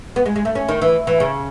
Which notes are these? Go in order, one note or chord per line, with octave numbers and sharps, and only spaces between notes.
B3
G#3
G#3
A3
C#4
D#3
E3
E3
C#3